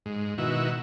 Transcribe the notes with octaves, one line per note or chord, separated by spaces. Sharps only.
G#2
B2 D#3 E4 F#4